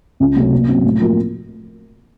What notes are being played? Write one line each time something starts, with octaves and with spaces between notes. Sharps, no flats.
C#2
C3 F#3 A3 C#4
A#2
F#3 C4
A2
F3 A#3 F4